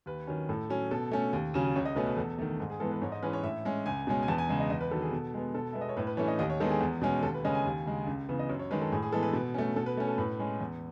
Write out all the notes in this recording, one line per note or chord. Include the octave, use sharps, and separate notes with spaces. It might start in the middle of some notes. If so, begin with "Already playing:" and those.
D#2 B4
D#3 F#3 C#4
A2 A4
F#3 C#4
B2 A4
A3 C#4
D#2
C#3 F#3 C#4
C#2 C#5
D#5
B2 A3 C#4 B4
B4
E2 A4
D#3 A3
G#2 G#4
G#4
E3 G#3 B3 A4
B4
G#2 C#5
D#5
E3 G#3 C#4 B4
C#5
A2 E5
G#3 C#4
C#2 G#5
B2 G#3 C#4
G#5
E2 A5
G#5
C#3 G#3
D#5
E2 D#5
B4
D#3 F#3 A4
G#4
B2 A4
G#3 B3
B2 A4
G#3 B3 E5
D#5
C#5
A2 B4
B4
E3 A3 C#4 C#5
D#5
D#2 D#5
C#5
D#3 G#3 B3 A4
G#4
E2
B2 G#3 C#4
D#2 A4
B4
C#3 G#3 C#4 D#5
G#5
D#2
C#3 G#3
C#2
C#3 E3 B3
D#5
F#2 C#5
C#5
D#3 G#3 B4
A4
A2 G#4
G#4
E3 G#3 B3 A4
B4
B2
A3 C#4
B2 A4
B4
A3 C#4
A4
A2 B4
G#3 C#4
E2